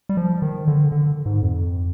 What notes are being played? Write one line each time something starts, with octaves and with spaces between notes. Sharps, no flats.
G3
F3
D#3
D3
D3
G#2
F2